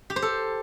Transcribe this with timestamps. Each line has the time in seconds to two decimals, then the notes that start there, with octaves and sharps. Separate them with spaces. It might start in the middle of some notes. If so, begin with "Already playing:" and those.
0.10 G4
0.16 C5
0.22 A4